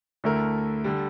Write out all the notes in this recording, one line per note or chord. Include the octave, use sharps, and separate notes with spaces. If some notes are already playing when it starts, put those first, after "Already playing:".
D2 D3 A3 E4 A#4
D3 G3